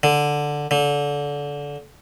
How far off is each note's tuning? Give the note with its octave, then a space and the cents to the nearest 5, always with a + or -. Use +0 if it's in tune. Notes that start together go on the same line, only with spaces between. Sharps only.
D3 +0
D3 -25